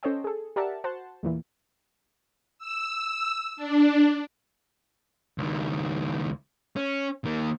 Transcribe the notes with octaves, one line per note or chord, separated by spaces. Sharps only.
C#4 A4 C5 C#5 D#5 G5
G#4 A4
G4 A#4 D5 E5 F#5 A5
F#4 C5 F#5 A5 C6
E2 A#2 E3
E6
D4
C#2 D#3
C#4
D#3 A#3